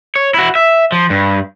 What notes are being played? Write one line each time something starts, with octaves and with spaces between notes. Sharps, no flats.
C#5
E4 F#4
E5
F3
G2